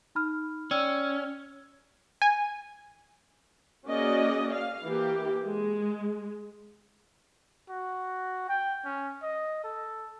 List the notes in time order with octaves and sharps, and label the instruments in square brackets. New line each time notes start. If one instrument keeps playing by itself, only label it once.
[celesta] D#4 B5 F6
[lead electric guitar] C#4 [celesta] D5 G5 E6
[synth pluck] G#5
[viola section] A#3 C#4 F#4 G#4 D5 D#5
F5
E3 A#3 G4
G#3
[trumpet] F#4
G5
C#4
D#5
A4